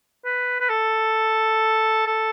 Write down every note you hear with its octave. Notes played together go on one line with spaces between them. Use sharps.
B4
B4
A4
A4